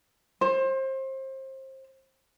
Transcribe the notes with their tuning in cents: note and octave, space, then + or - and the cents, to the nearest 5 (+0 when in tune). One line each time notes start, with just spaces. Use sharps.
C5 +30